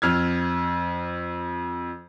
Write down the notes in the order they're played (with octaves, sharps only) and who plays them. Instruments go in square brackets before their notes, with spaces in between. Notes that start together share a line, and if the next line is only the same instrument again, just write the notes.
[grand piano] F2 F6 G#6